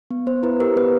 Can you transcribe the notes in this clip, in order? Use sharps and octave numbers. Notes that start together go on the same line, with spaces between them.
B3
B3 C5
E4 B4
G4 A#4
B3 B4